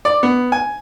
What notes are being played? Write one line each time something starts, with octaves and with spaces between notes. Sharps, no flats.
D5
B3
G#5